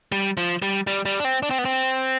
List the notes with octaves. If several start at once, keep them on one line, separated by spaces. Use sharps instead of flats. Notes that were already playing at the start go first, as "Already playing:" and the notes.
G3
F3
G3
G3
G3
D4
C4
D4
C4
B3
C4